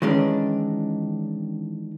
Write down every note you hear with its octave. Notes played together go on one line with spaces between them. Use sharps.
D#3 E3 G#3 C#4 D4